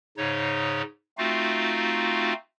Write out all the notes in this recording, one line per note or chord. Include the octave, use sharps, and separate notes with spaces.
G#2 C#3 D#4 C#5
A3 C4 D#4 F4 F#4 F5